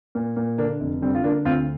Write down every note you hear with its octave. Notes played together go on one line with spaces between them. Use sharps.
A#2
A#2
D3 A#3 D4
F1
D3 G3 C4
F4
D3 A#3 D4
D2 C4 F4